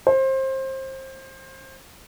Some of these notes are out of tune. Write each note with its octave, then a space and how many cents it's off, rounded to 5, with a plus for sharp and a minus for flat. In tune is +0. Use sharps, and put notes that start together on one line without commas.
C5 +25